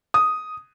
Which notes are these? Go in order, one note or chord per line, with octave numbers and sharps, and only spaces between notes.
D#6